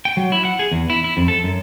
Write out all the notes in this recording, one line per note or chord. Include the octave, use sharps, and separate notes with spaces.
G5
F#3
E4
F#5
G#4
E2
E4
E4
F2
A4
F#2